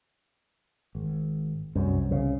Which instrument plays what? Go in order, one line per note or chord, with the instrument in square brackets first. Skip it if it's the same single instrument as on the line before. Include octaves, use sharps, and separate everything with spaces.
[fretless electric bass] G#1
[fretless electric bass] C2 [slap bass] F#2
[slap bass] C#3